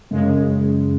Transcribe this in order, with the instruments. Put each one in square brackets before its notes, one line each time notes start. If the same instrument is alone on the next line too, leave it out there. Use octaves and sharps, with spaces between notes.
[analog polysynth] F#2 C#3 G#3